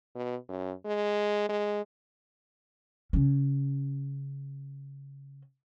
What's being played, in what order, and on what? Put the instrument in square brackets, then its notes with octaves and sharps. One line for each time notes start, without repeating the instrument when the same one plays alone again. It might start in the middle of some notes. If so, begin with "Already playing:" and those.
[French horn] B2
F#2
G#3
G#3
[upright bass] C#3 C#4